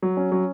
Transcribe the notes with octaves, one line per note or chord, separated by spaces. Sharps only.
F#3
C#4
F#3